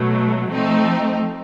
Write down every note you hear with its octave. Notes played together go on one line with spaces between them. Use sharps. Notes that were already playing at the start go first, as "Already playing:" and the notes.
Already playing: B2 F#3 A3
F3 A3 C4 D#4